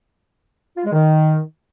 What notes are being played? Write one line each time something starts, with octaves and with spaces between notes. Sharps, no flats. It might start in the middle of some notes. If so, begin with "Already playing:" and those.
F4
G#3
D#3